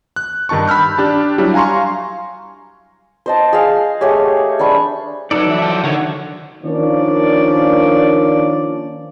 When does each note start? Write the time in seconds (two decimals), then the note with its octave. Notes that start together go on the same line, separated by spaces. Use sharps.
0.16 F#6
0.49 G2 D#3 D#4 A5 C#6
0.67 B5 E6 F6 G6
0.98 D4 G4 A5
1.38 F#3 G3 D4 E4
1.54 F5 G#5 A#5 C6 C#6
3.26 C5 D#5 A5
3.53 G#4 F5
4.01 A3 G4 G#4 C#5
4.59 D4 C5 B5 C#6
5.31 F#3 D#4 A4 B4 D5
5.46 E3 E5
5.62 F3 F#4 A5
5.84 D3 D#3 F#4 C#5 D5 F#5
6.63 D#3 F3 A#3 C#4 D4 D5